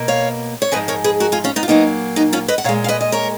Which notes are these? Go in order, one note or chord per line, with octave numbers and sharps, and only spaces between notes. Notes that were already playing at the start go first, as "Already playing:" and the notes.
Already playing: B2 A#3
C#5 F5
C#5
G#2 F3 G#3 B4 D#5
A#4 C#5
G#4 B4
F#4 A#4
F4 G#4
C#4 F4
B3 D#4
F4
A#2 F#3 A#3 B3 D#4
B3 D#4
C#4 F4
B4 D#5
F#5
A#2 G#3 C#5 F5
F5
B4 D#5
D#5
A#4 C#5